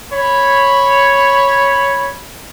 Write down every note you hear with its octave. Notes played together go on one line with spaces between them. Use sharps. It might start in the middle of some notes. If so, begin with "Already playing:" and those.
C#5 B5